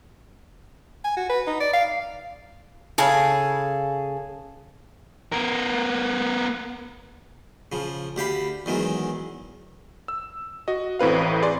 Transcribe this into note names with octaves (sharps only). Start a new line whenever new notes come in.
G#5
F#4
B4
D#4
D5
F5
C#3 G#4 A4
B3 A#4
C#3 F3
D2 G4 F5 B5
E2 D#3 F#3 G#3
E6
F#4 D#5
A1 A2 C4 B4 F5
G#4 D5 C6